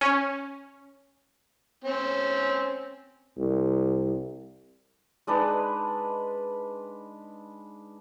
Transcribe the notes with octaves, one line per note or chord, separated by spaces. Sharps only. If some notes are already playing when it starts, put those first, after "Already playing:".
C#4
C4 C#4
C2
G#3 D4 D#4 B4